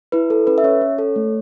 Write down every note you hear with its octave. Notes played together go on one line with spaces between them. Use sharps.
E4 B4
A4
C#4 B4
E5
C#4 C#5
C#4
A4
A3